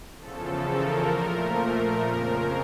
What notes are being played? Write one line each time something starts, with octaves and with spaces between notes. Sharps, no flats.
E2 C#3 F3 A4
A#4
A#2 F3 A3
F2 C#3 F3